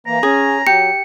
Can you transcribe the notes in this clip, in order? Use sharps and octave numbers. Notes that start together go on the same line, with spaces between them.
E3 A#3 A#5
C#4 G#4 G#5
F#3 G4 C#7